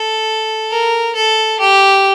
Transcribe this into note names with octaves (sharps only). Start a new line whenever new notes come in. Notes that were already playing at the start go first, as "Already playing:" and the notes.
Already playing: A4
A#4
A4
G4